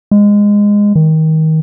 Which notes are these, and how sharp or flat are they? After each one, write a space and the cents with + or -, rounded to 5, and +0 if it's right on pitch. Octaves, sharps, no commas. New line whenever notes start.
G#3 -15
D#3 +25